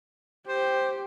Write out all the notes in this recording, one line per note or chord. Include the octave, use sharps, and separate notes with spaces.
G4 C5